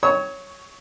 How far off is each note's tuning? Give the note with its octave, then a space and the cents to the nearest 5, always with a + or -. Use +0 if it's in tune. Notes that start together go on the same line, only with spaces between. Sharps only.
C#5 +0 C#6 +15 E6 -45